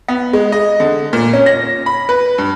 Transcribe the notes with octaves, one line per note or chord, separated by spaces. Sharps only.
B3
G#3
D#5
D3
A#2
C#4
A#6
B5
B4
G2